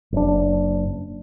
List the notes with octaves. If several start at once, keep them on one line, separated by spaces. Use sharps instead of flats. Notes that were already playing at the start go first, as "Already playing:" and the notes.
F#1 D4